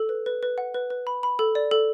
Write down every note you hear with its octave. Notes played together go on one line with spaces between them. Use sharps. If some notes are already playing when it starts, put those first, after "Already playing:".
Already playing: A4
B4
B4
B4
F#5
B4
B4
B5
B5
A4
D5
A4